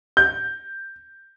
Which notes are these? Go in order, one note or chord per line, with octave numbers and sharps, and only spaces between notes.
G6